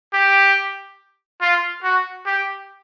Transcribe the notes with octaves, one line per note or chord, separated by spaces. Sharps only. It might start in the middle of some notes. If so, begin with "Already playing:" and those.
G4
F4
F#4
G4